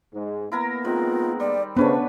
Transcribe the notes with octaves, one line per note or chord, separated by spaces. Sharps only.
G#2
A#3 B3 E4 A#4 A#5
D#3 G#3 C4 F4
G3 D5
C#3 A3 B3 C#4 D4 B4 C5